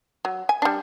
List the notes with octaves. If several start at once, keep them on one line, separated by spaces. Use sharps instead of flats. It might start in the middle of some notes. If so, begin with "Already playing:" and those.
F#3
G#5
G3 D4